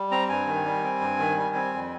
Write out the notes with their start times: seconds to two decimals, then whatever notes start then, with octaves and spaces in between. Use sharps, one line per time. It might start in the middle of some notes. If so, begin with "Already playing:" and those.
Already playing: G3
0.11 C4 A#5
0.29 G2 G#5
0.47 D#3
0.65 G3
0.84 C4
1.01 G2
1.19 D#3
1.36 G3
1.55 C4
1.74 F2